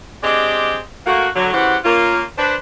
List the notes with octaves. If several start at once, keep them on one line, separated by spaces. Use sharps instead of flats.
G#3 C4 D4 G4 D#5
A3 A#3 F#4
D3 F#3
C#3 E3 F#4 G4 C5 F#5
A#3 C#4 F4
D4 B4 C5